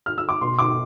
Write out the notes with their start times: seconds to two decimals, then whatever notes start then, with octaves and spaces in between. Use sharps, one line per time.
0.06 F6
0.18 E6
0.29 D6
0.41 B2 C6
0.59 D6